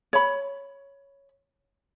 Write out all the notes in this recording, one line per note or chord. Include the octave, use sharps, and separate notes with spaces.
C#5 B5